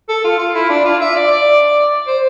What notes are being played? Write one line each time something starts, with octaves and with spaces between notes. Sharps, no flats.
A4
F4
F4
E4
D4
F4
E5
D5
D5
C5